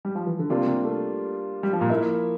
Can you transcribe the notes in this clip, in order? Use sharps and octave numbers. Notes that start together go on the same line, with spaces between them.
G3
F3
E3
D3
C3 G3 A#3 D4 F4
C3
A3
G3
F3
A#2
F3 A#3 E4 A#4 E5